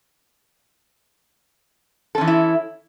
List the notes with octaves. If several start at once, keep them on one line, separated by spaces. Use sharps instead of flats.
E3 C#4 D#4 E4 A4